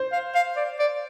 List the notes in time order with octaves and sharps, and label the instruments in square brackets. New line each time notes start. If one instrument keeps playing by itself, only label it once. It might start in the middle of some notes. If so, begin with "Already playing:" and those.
Already playing: [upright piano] C5
[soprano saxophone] F5
F5
D5
D5